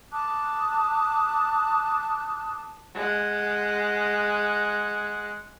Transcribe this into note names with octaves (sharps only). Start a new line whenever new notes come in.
A5 D6 D#6 F#6
G#3 F#5